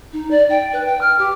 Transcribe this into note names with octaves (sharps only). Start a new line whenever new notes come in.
D#4
D5
G5
B4
G5
F6
G4